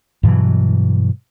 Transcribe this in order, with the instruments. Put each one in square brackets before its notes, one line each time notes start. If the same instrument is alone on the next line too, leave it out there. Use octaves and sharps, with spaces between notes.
[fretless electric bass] G2 B2 E3 F#3